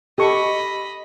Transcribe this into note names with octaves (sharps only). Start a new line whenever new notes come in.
G4 A4 D#5 B5 C#6